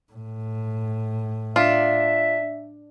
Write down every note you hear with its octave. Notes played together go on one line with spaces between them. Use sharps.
A2
D4 F4 E5